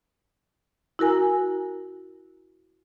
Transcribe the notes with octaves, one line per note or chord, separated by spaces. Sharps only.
E4 F#4 A#4 G#5 A#5